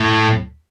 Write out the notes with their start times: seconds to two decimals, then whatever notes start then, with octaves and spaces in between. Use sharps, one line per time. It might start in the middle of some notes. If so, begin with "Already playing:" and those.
Already playing: A2